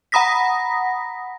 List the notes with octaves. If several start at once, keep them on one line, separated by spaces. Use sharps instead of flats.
F#5 A#5 B5 D#6 A#6 B6